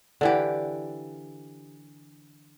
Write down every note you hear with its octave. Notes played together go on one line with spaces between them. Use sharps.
D3 E3 G4